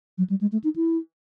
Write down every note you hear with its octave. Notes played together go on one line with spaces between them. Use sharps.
F#3
G3
G#3
A3
D#4
E4